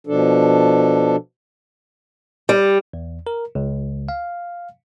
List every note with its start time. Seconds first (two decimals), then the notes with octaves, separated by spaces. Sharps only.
0.07 B2 F3 D4 A4
2.49 G3
2.93 E2
3.27 A#4
3.55 C#2
4.09 F5